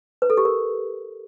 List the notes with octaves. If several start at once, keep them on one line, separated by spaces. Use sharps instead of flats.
B4
A4
G4
A#4